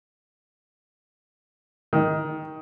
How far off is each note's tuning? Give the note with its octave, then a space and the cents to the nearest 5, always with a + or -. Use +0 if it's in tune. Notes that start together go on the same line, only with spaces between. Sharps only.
D#3 +15